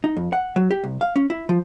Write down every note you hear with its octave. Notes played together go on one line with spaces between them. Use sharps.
D#4
F2
F#5
F#3
G4
C2
F5
C#4
E4
F3